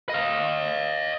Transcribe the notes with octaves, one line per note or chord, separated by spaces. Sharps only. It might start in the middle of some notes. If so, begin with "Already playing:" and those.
D#5 F5